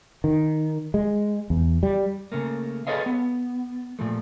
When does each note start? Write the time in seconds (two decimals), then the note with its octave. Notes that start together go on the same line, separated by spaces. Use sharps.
0.24 D#3
0.94 G#3
1.50 E2
1.83 G3
2.32 C#3 A3 A#3
2.87 G#4 A4 B4 C#5 D#5 F5
3.06 B3
3.99 A#2 F3 A3